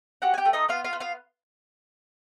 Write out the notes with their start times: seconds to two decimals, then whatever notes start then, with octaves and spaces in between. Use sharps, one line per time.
0.22 F#4 G4 F#5
0.34 G#5
0.38 G4 G5
0.45 A3
0.53 D#4 D#5
0.69 B3 F4 F5
0.84 F4 F5
0.93 B3
1.00 F4 F5